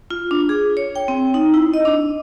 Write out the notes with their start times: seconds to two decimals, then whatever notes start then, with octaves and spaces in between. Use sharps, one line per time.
0.11 F4
0.31 D4
0.49 G#4
0.77 C#5
0.96 G5
1.08 C4
1.34 D#4
1.54 E4
1.74 D#5
1.85 D4